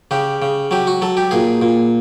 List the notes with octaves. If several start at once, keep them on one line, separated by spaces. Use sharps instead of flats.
C#3 G4
C#3
F#3 G4
F#4
F#3 A4
G4
A#2 G#4
A#2